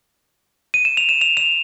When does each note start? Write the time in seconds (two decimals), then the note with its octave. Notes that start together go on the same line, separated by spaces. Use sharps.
0.74 D#7
0.85 E7
0.97 F7
1.09 E7
1.21 F7
1.37 F7